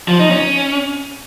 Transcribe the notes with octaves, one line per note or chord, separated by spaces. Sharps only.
F3
D#4
C#4